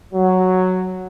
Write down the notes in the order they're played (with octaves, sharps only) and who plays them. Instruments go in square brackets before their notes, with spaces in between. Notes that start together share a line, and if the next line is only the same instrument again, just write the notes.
[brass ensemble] F#3